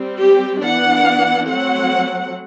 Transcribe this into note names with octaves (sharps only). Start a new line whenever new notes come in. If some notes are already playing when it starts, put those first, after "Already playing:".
Already playing: G3 C4
G4
E3 B3 D4 F#5
F#3 A3 C4 F#5